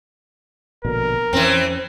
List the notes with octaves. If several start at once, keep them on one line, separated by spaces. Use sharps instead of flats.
A#1 B2 D3 A#4
F2 E3 C4 C#4